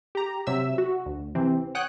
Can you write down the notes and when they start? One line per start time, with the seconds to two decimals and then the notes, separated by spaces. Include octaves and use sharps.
0.15 G4 A#5
0.47 C3 F#3 E5 E6
0.78 F#4
1.06 D2
1.35 C3 E3 C4
1.75 C#5 F#5 G5 D#6 F#6